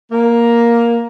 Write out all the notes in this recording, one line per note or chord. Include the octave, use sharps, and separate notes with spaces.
A#3